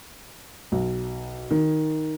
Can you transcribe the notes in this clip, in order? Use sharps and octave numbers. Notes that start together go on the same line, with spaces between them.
B1
D#3